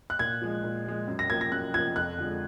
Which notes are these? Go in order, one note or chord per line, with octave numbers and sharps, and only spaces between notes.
F#6
A#2 G#6
F3 G#3
A#2
F3 G#3
F#2
A#6
F3 A#3 G#6
A#6
F#2 F#6
F3 A#3 G#6
F2 F#6
D3 F3 G#3